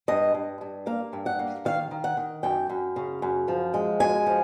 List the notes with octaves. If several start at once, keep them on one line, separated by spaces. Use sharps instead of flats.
G2 D#5
G2
G2
A#3 F5
G2
F#5
A#3
D#3 F5
D#3
F#5
D#3
F#2 G5
F#2
C#3
F#2
F3
G#3
F#2 G#5
F3